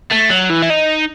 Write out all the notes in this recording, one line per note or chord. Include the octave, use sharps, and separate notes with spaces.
A3
F#3
E3
E4
D#4